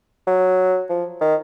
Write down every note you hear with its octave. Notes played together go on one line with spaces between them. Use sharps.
F#3
F3
D#3